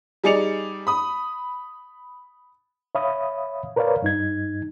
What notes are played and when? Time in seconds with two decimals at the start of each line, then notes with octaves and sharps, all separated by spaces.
0.24 G3 D#4 G#4 D5 C#7 F7
0.87 B5 D#6
2.95 C#5 E5 F5 B5 D#6
3.76 A#4 B4 C#5 D5 F5
4.02 G2 D#4 G#6